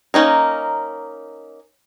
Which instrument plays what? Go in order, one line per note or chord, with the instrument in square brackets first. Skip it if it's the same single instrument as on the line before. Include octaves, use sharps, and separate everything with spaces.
[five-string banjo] A#3 C#4 D#4 A#4